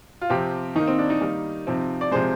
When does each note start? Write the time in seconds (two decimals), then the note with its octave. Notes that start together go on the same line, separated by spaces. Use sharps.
0.21 F4
0.30 C3 F3 C4 G4
0.75 D#3 A#3 D#4
0.87 C4
0.98 D4
1.10 D#4
1.21 D#3 G3 A#3
1.67 C3 F3 C4
2.01 D5
2.12 C3 F3 G#3 C5